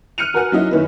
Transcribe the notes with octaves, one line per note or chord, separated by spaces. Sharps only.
F6 F#6 C#7 D#7 F7
F#4 A#4 B4 F#5 G#5 F6
F#3 C#4 D#4 E4 F#4 D#5
F#2 D#3 C#4 E4 B4